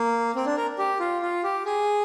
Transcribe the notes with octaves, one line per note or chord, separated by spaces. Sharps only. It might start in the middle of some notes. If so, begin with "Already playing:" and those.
Already playing: A#3
C4
D4
A#4
G4
F4
F4
G4
G#4